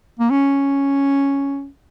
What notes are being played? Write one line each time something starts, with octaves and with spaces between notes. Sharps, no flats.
A#3
C#4